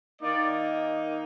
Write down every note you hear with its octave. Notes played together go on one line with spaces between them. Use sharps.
D#3 A#3 D#4 D5